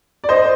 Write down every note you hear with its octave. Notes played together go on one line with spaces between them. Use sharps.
D5
C5 D#5